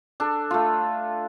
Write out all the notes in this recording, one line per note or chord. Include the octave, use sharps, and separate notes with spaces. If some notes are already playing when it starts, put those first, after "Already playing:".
D4 A4
A3 F4